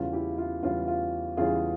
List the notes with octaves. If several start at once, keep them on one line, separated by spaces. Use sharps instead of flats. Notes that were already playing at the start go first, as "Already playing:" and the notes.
Already playing: E2 C#3 E3 G3 C#4 F4
E4 G4
F4
E2 C#3 E3 G3 C#4 F4
F4
E2 C#3 E3 G3 C#4 F4 G#4